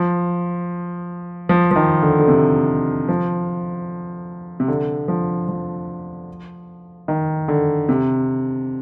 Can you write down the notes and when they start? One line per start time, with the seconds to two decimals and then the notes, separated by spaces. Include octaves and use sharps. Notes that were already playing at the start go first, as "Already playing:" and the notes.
Already playing: F3
1.49 F3
1.71 F3
1.76 D#3
2.03 D3
2.19 D3
2.28 C3
3.08 F3
4.60 C3
4.68 D3
5.08 F3
5.48 F3
7.08 D#3
7.48 D3
7.89 C3